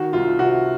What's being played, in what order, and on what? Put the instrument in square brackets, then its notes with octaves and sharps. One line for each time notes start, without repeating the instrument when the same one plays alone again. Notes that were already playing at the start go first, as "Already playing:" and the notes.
Already playing: [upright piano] D#3 F#4
C2 F4
C3 F#4